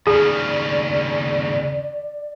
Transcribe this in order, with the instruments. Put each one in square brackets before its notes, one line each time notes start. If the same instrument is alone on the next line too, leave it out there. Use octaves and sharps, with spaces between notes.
[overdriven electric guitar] D#2 C#3 [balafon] G#4 [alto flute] D5